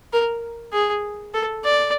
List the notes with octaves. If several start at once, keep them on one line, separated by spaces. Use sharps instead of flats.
A#4
G#4
A4
D5